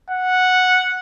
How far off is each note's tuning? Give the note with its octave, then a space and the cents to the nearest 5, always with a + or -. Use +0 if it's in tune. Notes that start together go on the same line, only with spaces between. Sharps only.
F#5 -10